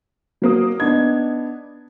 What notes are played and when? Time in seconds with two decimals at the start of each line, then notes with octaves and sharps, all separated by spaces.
0.42 F#3 A#3 D#6
0.80 B3 D4 D#4 G#6